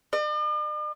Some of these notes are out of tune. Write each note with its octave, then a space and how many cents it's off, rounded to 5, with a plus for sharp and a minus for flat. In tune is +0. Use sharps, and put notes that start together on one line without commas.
D5 +45